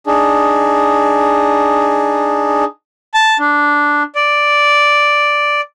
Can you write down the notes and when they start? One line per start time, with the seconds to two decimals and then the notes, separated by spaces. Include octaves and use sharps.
0.07 D4 D#4 G#4
3.14 A5
3.39 D4
4.15 D5